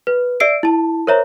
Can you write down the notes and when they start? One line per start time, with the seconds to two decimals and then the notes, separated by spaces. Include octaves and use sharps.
0.07 B4
0.40 D5 E5 E6 C7 D7
0.63 E4 A5
1.07 A#4 C5 C#5 E5 A#5